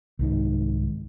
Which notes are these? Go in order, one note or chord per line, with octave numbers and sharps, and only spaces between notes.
C2 G#2 D#3